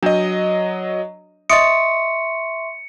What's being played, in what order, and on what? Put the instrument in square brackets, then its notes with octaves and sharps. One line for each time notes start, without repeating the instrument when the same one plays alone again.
[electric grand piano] F#3 D#5 [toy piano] D4 C#5
[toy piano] D#5 D#6 [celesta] E5 C6 C#6 [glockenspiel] C#7 [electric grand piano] D7